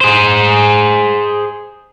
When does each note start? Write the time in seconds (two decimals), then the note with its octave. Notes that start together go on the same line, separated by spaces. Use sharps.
0.01 G#4 C5